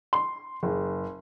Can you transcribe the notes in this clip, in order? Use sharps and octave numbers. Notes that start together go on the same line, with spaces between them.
C6
F#1